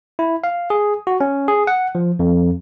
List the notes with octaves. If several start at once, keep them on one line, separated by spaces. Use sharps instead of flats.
E4
F5
G#4
F#4
C#4
G#4
F#5
F3
F2